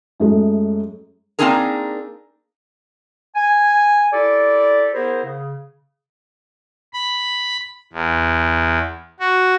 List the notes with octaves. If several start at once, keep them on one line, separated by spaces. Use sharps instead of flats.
F#2 G#3 A3
A#3 C4 D4 D#4 G#4 A#4
G#5
E4 G4 A4 D5
B3 E4 G#4 A#4 C5
C#3
B5
E2
F#4